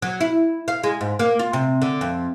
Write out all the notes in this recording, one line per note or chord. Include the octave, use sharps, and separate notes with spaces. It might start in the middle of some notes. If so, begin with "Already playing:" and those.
F#3
E4
F5
G#3
G#2
A#3
F4
C3
D3
F2